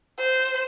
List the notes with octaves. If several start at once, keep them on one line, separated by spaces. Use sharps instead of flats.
C5